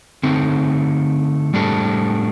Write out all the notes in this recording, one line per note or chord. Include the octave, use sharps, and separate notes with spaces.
D3 A3 C4 D#4
A2 G3 D4 A4